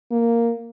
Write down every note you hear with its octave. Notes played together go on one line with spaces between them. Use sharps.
A#3